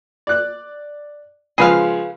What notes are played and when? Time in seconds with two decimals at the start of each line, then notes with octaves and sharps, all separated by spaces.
0.27 D5 F#6
1.58 C#3 F3 G#3 G#4 B4 F5